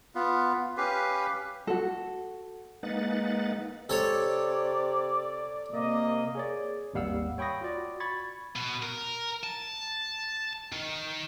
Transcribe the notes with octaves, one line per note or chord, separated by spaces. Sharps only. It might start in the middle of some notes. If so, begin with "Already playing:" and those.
B3 F4
C#4 G4 B4 F5
F#4 A4
G#3 A#3 D#4 B4 F#5 A6
C3 A4 C#5 D5
C3 A#3 D#5
G#4 C#5 D5
G#1 D#2 G3 F5 F#5 E6
C#5 G5 B5 C#6 D#6 A#6
F4 F#4 D5
B5 C#6 G#6 A6
B2
A#4
A5
D#3